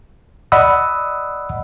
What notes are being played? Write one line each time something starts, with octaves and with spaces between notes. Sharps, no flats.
D5 D#5 F#5 B5 D#6 E6